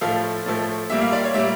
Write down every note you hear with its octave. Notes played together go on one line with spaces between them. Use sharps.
A2 F3 A3 F5
A2 F3 A3
A#2 G3 A#3 E5
F5
D5
C#5
A#2 G3 A#3 E5